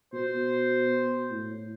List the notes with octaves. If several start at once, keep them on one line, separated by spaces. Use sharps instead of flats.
B2 C5
A2